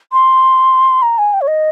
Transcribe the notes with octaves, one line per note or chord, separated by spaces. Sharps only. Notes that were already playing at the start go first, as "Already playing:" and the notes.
C6
A#5
G#5
G5
C#5
D#5